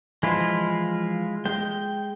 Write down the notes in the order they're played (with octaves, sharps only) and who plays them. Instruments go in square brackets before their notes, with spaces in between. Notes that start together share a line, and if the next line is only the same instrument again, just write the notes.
[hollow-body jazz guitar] E3 F3 [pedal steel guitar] G#3 E4 F4
[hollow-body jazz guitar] G#3 [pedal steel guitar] G5